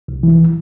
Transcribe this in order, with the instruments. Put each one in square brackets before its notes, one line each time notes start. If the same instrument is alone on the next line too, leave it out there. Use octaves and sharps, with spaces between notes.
[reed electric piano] C2
E3